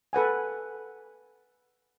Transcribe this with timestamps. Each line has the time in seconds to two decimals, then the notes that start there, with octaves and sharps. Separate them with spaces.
0.13 A4 B4 F#5 G#5